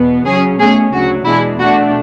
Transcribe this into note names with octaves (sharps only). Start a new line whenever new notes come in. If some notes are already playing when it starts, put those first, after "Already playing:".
Already playing: E2 B2 B3
C#3 F#3 C#4 G#4
B2 A3 C#4 G#4
D2 C#3 F#3 F#4
E2 B2 G#3 D4 E4
B2 A3 D4 F#4